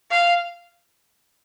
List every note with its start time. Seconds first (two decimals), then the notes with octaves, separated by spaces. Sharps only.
0.11 F5